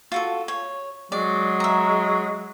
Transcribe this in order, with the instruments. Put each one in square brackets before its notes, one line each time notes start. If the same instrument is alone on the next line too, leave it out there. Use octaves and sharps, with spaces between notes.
[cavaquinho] F4 F#4 A4
C#5
[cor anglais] F#3 [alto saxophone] G#3 [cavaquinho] D5
[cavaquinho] E5 A#5